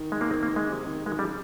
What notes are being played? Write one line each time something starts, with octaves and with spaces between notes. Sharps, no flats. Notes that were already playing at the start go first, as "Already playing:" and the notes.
Already playing: D#3
G#3
A#3
C4
A#3
G#3
C3
D#3
D#3 G#3
C#3 G3